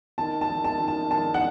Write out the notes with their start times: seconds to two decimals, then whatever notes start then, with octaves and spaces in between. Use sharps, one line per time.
0.18 D#3 A5
0.41 A5
0.49 D#3
0.64 A5
0.80 D#3
0.88 A5
1.11 D#3 A5
1.34 F#5